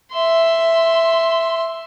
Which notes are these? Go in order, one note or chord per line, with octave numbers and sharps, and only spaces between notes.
E5 C6